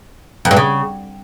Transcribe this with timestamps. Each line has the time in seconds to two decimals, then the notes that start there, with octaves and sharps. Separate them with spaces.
0.45 F2
0.51 G2
0.57 C#3